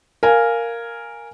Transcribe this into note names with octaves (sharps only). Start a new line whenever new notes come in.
A#4 F5 G#5